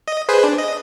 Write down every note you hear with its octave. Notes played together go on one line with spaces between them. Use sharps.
D#5
G#4 B4 C5
D4
D#5